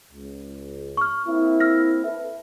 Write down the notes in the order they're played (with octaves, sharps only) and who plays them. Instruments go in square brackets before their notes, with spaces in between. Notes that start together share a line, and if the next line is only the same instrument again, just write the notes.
[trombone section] C#2
[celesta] C#6 F6
[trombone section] A#3 C4 E4
[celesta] E6 F6 A#6
[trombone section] A4 B4 [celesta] E5